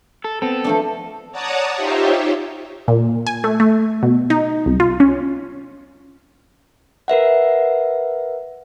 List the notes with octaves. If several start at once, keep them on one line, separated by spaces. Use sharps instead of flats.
A4
B3 C4 A4
F3 A3 D4
C#5 D5 F#5 A5 A#5 D#6
D#4 F4 G4 C5 C#5 E5
A#2
G#5
A3
A3
B2
D#4
C2
F4
C#4
A#4 B4 E5 F#5